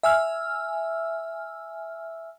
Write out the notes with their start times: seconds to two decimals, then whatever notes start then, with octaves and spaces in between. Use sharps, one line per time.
0.03 E5 G#5 E6 F6